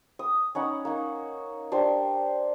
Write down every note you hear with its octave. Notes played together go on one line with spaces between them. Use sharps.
D#6
C#4 D#4 F#5 B5
A#3 D#4
D4 G4 C5